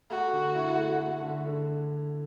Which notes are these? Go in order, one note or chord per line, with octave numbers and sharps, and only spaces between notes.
A3 F#4
D3
E4
A3
A3
D3
D3